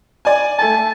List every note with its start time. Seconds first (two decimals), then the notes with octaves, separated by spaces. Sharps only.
0.25 D5 G#5
0.59 A3 G#5 A5